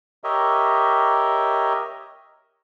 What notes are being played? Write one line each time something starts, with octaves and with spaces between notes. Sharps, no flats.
G4 A#4 C#5 D#5 E5